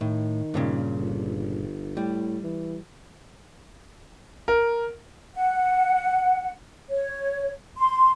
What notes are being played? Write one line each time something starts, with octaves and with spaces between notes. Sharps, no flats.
A2 D#3
G2 A#2 C#3
G1
A2 G3
E3
A#4
F#5
C#5
C6